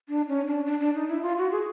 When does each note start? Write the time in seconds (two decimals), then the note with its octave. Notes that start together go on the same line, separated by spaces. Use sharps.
0.09 D4
0.28 C#4
0.47 D4
0.66 D4
0.80 D4
0.95 D#4
1.09 E4
1.23 F4
1.38 F#4
1.52 G#4